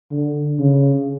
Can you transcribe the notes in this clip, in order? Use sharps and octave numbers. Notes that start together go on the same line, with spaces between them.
D3
C#3